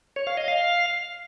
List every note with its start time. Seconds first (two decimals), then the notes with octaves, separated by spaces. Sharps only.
0.16 C#5
0.27 F5
0.37 D#5
0.48 F5